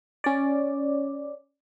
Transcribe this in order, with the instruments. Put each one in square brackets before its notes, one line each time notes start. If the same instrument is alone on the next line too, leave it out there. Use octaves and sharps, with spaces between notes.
[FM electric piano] C#4 D5